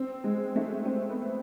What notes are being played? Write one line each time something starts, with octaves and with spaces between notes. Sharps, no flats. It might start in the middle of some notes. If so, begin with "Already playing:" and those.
Already playing: C4
G#3
A3
C4
B3